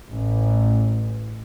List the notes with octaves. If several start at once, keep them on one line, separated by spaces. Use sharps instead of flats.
A1